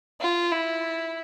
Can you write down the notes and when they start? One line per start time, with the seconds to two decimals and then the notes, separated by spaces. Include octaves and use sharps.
0.21 F4
0.52 E4